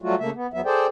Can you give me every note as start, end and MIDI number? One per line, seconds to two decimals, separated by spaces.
0.02 0.15 54
0.02 0.15 55
0.02 0.15 57
0.02 0.15 65
0.02 0.15 66
0.19 0.30 49
0.19 0.30 57
0.19 0.30 58
0.19 0.30 76
0.35 0.47 59
0.54 0.61 40
0.54 0.61 54
0.54 0.61 59
0.54 0.61 76
0.65 0.87 68
0.65 0.87 69
0.65 0.87 72
0.65 0.87 74
0.65 0.87 79